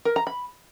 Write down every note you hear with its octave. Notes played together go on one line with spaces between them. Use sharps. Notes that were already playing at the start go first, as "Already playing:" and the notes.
A#4
A#5
B5